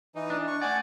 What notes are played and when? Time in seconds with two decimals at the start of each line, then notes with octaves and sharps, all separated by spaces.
0.15 E3 D#4
0.30 D4
0.47 C#6
0.62 A3 D5 F#5 G#5